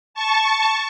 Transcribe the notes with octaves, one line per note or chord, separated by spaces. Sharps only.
A5 C#6